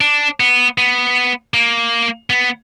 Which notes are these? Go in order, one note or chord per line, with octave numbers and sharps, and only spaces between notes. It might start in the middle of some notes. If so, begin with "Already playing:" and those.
D4
B3
B3
A#3
B3